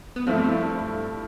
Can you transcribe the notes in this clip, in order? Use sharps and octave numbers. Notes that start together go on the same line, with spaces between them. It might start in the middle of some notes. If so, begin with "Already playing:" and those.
B3
G2 F3 A3 C4 E4